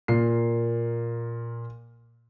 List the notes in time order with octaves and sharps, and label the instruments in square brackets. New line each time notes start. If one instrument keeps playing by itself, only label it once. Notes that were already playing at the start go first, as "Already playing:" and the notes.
[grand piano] A#2 A#3 C7